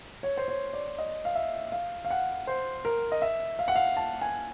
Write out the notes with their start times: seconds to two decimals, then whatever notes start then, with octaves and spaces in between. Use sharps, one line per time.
0.23 C#5
0.38 C5
0.48 C#5
0.73 D5
0.99 D#5
1.25 F5
1.35 E5
1.72 F5
2.05 F5
2.10 F#5
2.47 C5
2.85 A#4
3.12 D#5
3.22 E5
3.59 F5
3.68 F#5
3.76 F5
3.97 A5
4.22 G#5